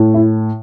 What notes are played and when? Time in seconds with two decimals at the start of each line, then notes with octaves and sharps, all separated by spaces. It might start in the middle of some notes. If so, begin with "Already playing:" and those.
Already playing: A2
0.14 E4